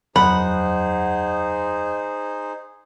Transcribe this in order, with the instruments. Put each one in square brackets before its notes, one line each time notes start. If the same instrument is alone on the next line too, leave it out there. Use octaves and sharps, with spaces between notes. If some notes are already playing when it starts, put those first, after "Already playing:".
[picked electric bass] F#1 E2 F#3 [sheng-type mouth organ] D#4 G#4 C5 [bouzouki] F#5 [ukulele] B5